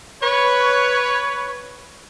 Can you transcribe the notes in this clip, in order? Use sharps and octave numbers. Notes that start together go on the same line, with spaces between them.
B4 C#5